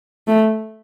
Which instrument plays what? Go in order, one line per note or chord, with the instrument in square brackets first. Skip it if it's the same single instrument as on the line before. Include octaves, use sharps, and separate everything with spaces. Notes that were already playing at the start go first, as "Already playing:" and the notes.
[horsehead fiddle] A3